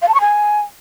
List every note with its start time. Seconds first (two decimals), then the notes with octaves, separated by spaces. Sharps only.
0.02 F5
0.08 A5
0.14 C#6
0.21 G#5